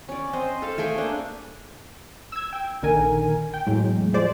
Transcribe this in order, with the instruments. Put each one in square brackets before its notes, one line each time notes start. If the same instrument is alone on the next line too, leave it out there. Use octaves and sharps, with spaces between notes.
[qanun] C#4 D5
C4 C5 D#5
A4 F5
A3 G#4 G5 G#5
A#3 D4
[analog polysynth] E6 G#6
G5
A#1 D3 D#3 A#4 G#5
G5
E2 A2 F#3 G#3
F3 G#3 C5 D5